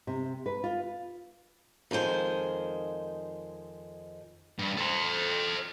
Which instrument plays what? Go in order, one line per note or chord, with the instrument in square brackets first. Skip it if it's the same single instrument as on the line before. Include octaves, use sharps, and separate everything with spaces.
[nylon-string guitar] C3
B4
F4
[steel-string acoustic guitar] F2 D#3 G#3 C5
[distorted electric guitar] G2
A4 C5